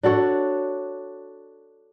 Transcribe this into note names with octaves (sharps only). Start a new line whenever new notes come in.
D4 F#4 A4 C#5